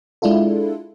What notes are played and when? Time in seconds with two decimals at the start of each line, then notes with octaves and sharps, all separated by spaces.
0.22 G#3 D4 E4 F4 A4